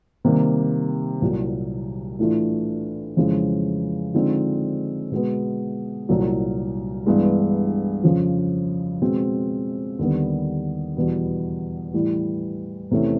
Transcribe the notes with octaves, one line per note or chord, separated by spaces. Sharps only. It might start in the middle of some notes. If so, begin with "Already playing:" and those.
C3 D#3 G3 A#3
C2 A#2 F#3
A2 E3 A3 D4 F4
F2 C#3 E3 G#3
D3 F3 G#3 C4 D#4
B2 G#3 B3
C2 A#2 F#3
G2 E3 G#3 B3
F2 C#3 F3
B2 G#3 C4
D#2 D3 G3 B3
E2 B2 G3 B3
A2 E3 G3
E2 C3 E3 A3 C#4